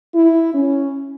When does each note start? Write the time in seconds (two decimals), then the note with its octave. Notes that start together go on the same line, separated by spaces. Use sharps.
0.14 E4
0.54 C#4